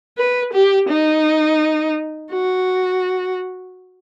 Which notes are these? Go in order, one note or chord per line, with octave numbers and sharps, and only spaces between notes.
B4
G4
D#4
F#4